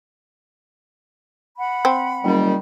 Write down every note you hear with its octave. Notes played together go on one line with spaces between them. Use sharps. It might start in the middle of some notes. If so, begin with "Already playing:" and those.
F#5 B5
C4
F#1 D#3 G3